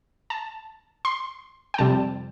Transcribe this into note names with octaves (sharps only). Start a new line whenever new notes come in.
A5
C6
G5
F2 C3 G3 C4 A5